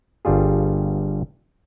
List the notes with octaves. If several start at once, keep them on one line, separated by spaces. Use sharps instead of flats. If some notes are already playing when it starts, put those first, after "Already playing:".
G1 G2 G3 F4 G#4